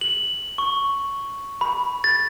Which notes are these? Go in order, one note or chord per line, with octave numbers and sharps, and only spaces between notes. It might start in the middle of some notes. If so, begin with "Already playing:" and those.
F#7
C#6
B5
A6